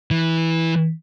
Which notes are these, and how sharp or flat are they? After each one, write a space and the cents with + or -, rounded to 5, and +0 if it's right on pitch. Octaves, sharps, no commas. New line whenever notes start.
E3 -10